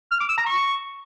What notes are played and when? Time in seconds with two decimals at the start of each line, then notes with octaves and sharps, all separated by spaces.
0.11 F6
0.20 D6
0.29 E6
0.37 A#5
0.46 C#6